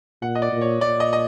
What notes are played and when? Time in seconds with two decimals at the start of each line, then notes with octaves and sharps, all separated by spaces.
0.22 A#2 F#5
0.35 D#5
0.42 D5
0.52 A#2
0.61 C#5
0.81 A#2 D5
1.00 D#5
1.13 D#5